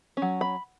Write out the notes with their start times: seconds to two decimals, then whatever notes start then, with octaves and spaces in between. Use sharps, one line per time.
0.17 C#4
0.22 F#3
0.41 B5